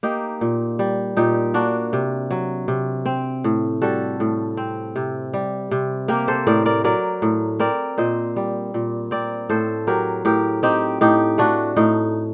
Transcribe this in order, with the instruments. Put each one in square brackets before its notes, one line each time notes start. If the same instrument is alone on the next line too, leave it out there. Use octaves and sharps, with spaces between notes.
[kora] A#3 D#4 G4
A#2
G3
A#2 D#4 G4
A#3 D4 F#4
C3
F#3
C3
C4
A2
G3 F#4 A4
A2
C4
C3
G3
C3
A#3 G4 A#4
A4 C5
A2 A#4 D5
A#4 D5
F#3 A#4 D5
A2
C4 A#4 D5
A#2 C5 D#5
G3
A#2
C4 A#4 D5
A2 A4 C5
F#3 G4 A#4
A2 G4 A#4
C4 D#4 G4
A2 D#4 G4
A3 D4 F#4
A2 D#4